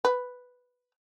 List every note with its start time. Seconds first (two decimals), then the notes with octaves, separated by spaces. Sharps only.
0.05 B4